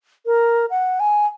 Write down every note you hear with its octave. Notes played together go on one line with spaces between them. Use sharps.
A#4
F#5
G#5